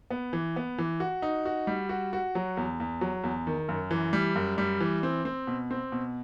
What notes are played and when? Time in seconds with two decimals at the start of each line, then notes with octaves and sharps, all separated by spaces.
0.11 B3
0.33 E3
0.56 B3
0.78 E3
1.00 F#4
1.22 D#4
1.45 F#4
1.67 G3
1.89 F#4
2.13 F#4
2.35 F#3
2.57 E2
2.80 E2
3.01 F#3
3.24 E2
3.47 D#3
3.69 F#2
3.91 E3
4.13 G3
4.35 F#2
4.58 G3
4.80 E3
5.03 C4
5.25 C4
5.47 B2
5.71 C4
5.92 B2